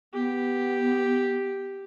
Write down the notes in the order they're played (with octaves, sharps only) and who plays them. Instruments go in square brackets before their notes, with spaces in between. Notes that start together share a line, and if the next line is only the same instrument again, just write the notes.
[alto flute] B3 [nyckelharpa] G4